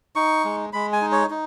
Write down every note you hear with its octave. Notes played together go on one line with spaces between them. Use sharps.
D#4 C#6
G#3
G#3 B5
G#5
D#4
C#5
D#4